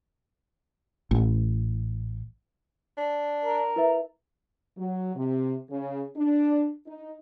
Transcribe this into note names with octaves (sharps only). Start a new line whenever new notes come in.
A1
D4
A#4
E4 B4 E5
F#3
C3
C#3
D4
D#4